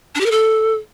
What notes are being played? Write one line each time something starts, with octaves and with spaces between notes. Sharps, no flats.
D4
G4
A#4
A4